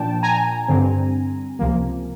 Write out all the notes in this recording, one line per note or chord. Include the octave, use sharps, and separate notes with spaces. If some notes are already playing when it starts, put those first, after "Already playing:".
Already playing: A#2 F3 A#3 D4 G5 A5
G#5 A#5
G2 D3 G3 C4
C#2 C3 F3 A#3